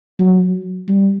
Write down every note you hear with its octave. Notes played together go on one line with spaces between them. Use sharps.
F#3
G3